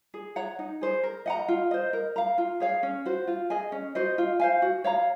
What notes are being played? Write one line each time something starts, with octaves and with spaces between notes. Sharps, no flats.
G#4
C#5 F#5 A#5
D#4
G#4 C5
A#4
D#5 F#5 A#5
F4
C5 D#5
A#4
F5 A#5
F4
G#4 C#5 F5
C#4
F#4 C5
F4
G#4 D#5 G#5
C#4
F#4 C5 D#5
F4
C5 F5 G#5
F#4
C#5 F5 A#5